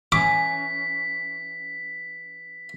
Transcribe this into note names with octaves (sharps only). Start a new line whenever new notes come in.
E3 C#4 D6 B6